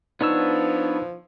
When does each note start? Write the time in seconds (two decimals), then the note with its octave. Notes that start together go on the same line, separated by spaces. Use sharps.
0.21 F3 B3 D4 D#4 B4 C#5 E6